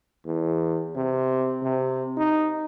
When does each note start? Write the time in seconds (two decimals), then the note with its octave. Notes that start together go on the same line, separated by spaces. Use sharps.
0.26 E2
0.96 C3
1.63 C3
2.17 D#4